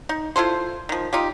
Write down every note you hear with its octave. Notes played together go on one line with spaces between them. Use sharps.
D#4
E4 F4 A4 C5
D#3 F3
D#4 F4 G4